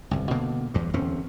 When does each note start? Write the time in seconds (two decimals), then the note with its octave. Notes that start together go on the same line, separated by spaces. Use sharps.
0.11 G1 C2
0.31 B2 D3 A#3
0.74 E2 G2
0.93 D1 E2 C4 C#4